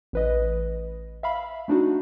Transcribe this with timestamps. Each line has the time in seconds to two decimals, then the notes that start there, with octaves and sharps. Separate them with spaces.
0.13 A1 B4 D#5
1.23 E5 F5 B5
1.68 A3 D4 D#4 F#4